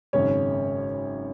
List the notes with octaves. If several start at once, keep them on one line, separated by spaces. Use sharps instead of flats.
G#1 F#2 C#3 G#3 C#4 C#5